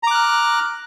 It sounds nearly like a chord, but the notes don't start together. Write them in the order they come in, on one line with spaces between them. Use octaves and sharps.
A#5 D6 F#6 F6